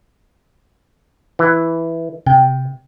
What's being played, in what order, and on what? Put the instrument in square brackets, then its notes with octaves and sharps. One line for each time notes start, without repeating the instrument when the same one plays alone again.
[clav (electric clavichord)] E3
[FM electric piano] C3 [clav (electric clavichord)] G5